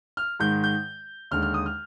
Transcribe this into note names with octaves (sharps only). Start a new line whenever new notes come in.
F6
G#2 D#3 G#3 G6
G6
D#2 D3 G#3 F6
F6
D#6
F6